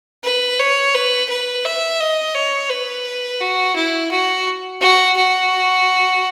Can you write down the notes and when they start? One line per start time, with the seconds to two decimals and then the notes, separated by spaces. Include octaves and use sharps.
0.24 B4
0.59 C#5
0.94 B4
1.29 B4
1.65 E5
2.00 D#5
2.35 C#5
2.70 B4
3.40 F#4
3.76 E4
4.11 F#4
4.81 F#4
5.17 F#4